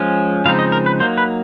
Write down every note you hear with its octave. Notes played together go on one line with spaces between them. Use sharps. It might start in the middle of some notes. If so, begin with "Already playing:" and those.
Already playing: F3 G#3 C#4
C#3 F3 G#3 C4 D#4 F5
D#5
A#4
B4
F#3 A#3 D#4 C5
B4